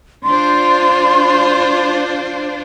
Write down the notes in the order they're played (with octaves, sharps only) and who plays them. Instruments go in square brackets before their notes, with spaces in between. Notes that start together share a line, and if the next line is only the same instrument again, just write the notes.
[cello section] D4 F4 C5 [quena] C6